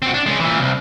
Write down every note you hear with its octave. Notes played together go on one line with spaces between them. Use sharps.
C4 F#4
D4
G#3 C#4
A#2 E3
C2